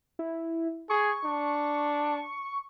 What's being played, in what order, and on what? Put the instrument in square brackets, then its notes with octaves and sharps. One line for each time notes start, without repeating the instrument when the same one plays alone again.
[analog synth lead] E4
[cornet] G#4 [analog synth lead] C#6
[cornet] D4